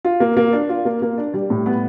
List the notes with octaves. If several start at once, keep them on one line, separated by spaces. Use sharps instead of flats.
F4
A#3
A#3
D4
F4
A#3
A#3
D4
G3
A2
B3